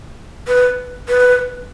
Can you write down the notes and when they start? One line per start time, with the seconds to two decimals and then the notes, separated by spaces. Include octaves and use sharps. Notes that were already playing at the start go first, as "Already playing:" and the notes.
0.48 B4
1.09 B4